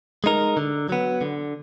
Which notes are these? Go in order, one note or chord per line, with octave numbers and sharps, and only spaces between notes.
G#3 D#4 A#4
D3
F#3 B3
D3